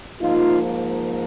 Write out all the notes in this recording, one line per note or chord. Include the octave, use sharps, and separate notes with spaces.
G#2 F3 A#3 D#4 F4